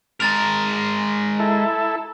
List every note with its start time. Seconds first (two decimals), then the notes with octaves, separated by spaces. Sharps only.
0.20 G#3 A#4 A#5 A6 F7
1.40 E4 A4